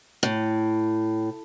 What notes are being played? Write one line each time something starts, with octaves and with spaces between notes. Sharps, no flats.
A2